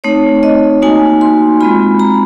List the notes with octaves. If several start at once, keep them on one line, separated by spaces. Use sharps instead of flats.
A3 C4 D#4 C#5
D#5
A#3 D#4 F#4 G#5
C6
G#3 C4 F4 B5
A#5